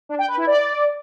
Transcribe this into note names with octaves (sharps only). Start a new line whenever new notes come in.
D4
G5
B4
E4
D5